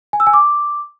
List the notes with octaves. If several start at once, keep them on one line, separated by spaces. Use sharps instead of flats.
G#5
E6
G#5
D6